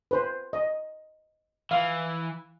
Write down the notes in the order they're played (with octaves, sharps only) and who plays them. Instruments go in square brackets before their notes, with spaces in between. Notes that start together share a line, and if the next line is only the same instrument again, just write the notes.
[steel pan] B4 C5
D#5
[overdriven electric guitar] E3 [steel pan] F5